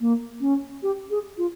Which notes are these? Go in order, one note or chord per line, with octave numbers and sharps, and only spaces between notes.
A#3
C#4
G4
G#4
F4